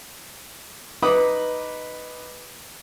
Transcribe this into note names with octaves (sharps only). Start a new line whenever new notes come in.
D#4 B4 B5 D6 D#6